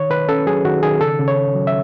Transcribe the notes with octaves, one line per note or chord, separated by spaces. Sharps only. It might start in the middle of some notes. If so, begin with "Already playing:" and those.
Already playing: D#3 C#5
D#3 B4
C#4 A4
F#3 G#4
D#3 F#4
D#3 G#4
C#3 A4
C#3
C#5
C#4
F#3
E5